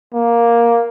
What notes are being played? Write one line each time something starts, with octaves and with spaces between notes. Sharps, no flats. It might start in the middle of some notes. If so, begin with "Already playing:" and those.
A#3